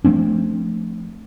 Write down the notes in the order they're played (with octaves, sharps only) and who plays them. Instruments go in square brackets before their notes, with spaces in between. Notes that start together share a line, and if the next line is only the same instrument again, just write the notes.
[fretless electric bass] F3 A3 C4 D4